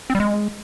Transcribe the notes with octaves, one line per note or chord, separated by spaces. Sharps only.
C4
G3
G#3